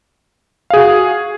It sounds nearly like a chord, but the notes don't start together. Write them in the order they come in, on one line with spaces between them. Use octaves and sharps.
F5 G#4 F#4